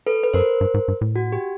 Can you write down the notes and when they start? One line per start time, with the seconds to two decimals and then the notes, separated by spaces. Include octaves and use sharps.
0.07 A4 B4
0.23 B4
0.33 F#2 A#4 C5
0.61 G2
0.74 G#2
0.88 G2
1.01 A2
1.16 F#4
1.32 G4